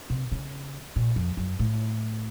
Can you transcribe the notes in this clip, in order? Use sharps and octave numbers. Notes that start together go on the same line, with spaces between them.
C3
C#3
A#2
F2
F#2
A2